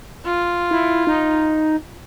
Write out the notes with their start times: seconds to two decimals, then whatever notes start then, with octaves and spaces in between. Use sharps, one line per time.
0.25 F4
0.71 E4
1.07 D#4